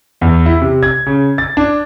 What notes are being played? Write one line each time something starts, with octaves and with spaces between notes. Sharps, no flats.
E2
E4
C3
G#6
C#3
A6
D4